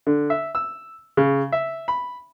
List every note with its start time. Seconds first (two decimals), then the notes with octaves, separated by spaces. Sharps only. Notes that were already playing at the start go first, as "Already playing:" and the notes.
0.07 D3
0.30 E5
0.55 E6
1.17 C#3
1.52 E5
1.88 B5